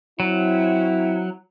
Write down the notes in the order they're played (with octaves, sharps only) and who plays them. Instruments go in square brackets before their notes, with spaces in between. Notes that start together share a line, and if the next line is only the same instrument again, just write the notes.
[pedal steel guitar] F#3 [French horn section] C4 E4